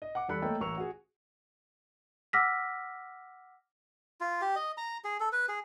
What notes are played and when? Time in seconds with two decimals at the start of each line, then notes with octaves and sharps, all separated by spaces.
0.02 D#5
0.15 F#5 D6
0.28 E2 G3 A4 B5 F#6 C#7
0.42 A3 A#3 A4 C#5 D#5 G5
0.60 A1 C#4 A#4 C#6 E6 F7
0.77 F#4 G#4
2.33 F#5 D6 E6 F6 A#6 B6
4.21 F4
4.42 G4
4.56 D#5
4.77 A#5
5.04 G#4
5.20 A4
5.32 B4
5.49 G#4